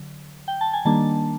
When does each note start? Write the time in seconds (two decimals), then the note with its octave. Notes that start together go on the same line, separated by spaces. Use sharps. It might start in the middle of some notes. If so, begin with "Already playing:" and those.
Already playing: D3 F#3
0.48 G5
0.61 A5
0.73 G#5
0.85 D#3 G3 A#3 D4 A5